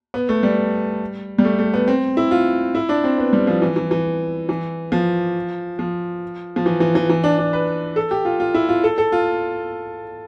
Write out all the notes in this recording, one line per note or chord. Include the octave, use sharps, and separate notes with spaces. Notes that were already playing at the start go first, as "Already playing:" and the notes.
B3
A3
G3
G3
A3
A3
B3
C4
E4
F4
E4
D4
C4
B3
G3
F3
E3
E3
E3
E3
F3
F3
F3
E3
E3
E3
E3
D4
D4
B4
A4
G4
F4
F4
E4
F4
A4
A4
F4